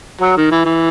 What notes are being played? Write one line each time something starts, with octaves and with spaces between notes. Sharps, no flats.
F#3
D#3
E3
E3